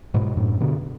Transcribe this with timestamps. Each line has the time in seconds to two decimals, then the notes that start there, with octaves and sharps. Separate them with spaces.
0.14 G#2 B2
0.37 F#2 A2
0.61 B2 D3